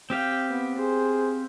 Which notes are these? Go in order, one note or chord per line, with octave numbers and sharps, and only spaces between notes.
C4 G4 F5 G5
B3
G#4 C5